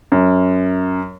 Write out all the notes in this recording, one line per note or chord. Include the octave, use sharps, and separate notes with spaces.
F#2